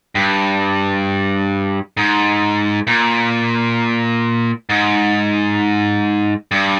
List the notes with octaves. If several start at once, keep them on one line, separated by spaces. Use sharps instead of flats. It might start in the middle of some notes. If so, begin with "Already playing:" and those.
G2
G#2
A#2
G#2
G2